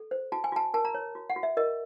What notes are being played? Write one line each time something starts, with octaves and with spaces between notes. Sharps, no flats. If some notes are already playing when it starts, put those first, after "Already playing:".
Already playing: A4
C5
F#4 A5
G#5
F#4 A5
A#4 A5
A#5
C#5
F#4
F#5
F#4
E5
A#4 D#5